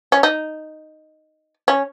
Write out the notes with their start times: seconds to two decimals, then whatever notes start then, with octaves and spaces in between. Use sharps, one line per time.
0.12 C#4
0.23 D#4
1.68 C#4